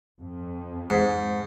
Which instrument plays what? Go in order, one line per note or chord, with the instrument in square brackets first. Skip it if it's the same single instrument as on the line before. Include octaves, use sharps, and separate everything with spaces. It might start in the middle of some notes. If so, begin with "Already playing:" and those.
[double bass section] F2
[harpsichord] G#2